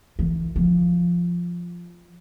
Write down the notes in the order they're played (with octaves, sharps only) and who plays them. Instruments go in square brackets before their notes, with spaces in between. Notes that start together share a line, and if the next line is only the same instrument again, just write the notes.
[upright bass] E3
F3